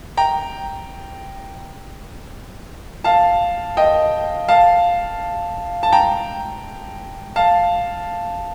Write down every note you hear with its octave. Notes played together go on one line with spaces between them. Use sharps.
G5 A#5
F5 A5
D#5 G5
F5 A5
A5
G5 A#5
F5 A5